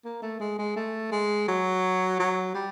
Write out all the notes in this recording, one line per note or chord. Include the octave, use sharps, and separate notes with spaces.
A#3
A3
G#3
G#3
A3
G#3
F#3
F#3
G3